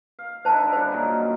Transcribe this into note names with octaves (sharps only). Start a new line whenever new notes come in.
F5
D3 D#4 E4 C5 A5
C#3 G3 C5
F#2 A#2 D#3